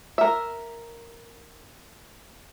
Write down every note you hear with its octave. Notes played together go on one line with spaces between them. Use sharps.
A#4 E5